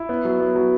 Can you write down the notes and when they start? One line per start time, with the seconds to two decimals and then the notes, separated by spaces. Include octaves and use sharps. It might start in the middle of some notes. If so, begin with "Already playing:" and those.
Already playing: E4
0.09 B3
0.25 F#3
0.40 B3
0.55 F#3